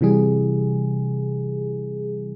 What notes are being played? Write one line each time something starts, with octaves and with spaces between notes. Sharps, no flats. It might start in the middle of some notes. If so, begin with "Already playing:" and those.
C3 E3 G3 G#4